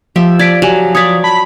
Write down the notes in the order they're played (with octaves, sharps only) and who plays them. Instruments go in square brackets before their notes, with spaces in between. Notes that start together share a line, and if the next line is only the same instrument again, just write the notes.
[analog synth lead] F3 [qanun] G4 E5
[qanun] D5 [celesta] G#6 B6 D7
[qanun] F#3 [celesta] G4 G#5
[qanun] C#5 D5 [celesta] D#6 G#6 B6
[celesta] A5 [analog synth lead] B5